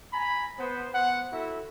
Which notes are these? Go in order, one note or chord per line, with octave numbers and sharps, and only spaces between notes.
G#5 A#5 B5
B3 C5
B3 C5 F#5
E4 F#4 A4 E5